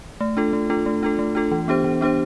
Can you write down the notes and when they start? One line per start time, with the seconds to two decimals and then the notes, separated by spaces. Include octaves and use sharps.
0.20 A3
0.37 D4 F4 A4
0.53 A3
0.70 D4 F4 A4
0.86 A3
1.03 D4 F4 A4
1.19 A3
1.35 D4 F4 A4
1.51 E3
1.68 B3 D4 G4 C5
1.84 E3
2.01 B3 D4 G4 C5